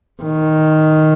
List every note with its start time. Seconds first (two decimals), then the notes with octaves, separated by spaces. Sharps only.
0.23 D#3